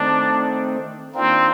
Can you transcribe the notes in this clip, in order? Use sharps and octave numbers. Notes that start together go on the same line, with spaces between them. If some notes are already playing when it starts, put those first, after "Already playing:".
Already playing: D#3 A3 C4 D4 D#4
D#3 A#3 C4 D4 F4 A#4